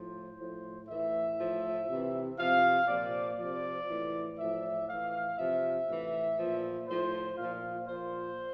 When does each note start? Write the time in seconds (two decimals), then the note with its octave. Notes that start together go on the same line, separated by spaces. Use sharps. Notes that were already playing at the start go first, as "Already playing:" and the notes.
Already playing: A2 F3 C5
0.38 A2 F3
0.89 A2 E3 E5
1.38 A2 F3
1.89 C3 E3
2.38 C3 F3 F5
2.88 A#2 F3 D5
3.38 C3 F3 D5
3.89 A2 E3
4.39 A2 F3 E5
4.88 A2 E3 F5
5.38 C3 F3 E5
5.88 A2 E3
6.38 A#2 F3
6.88 A2 F3 C5
7.38 A#2 F3 F5
7.87 A#2 F3 C5